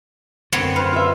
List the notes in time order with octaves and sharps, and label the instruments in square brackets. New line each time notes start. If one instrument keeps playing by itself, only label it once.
[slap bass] F#2 D3 [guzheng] B3 C4 C#5
[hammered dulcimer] B4 C5 [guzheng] F5
[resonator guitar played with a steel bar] F4 E5